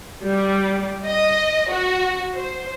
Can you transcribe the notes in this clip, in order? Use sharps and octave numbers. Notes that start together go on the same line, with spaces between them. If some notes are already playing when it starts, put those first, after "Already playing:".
G3
D#5
F#4
C5